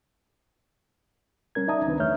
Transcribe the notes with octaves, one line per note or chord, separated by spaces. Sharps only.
G3 C#4 A#4 G#6
D#4 D5 E5 A5 A#5 D#6
C#2 D#3 C4 D4 B4
E2 A3 C#5 E5 F6 G6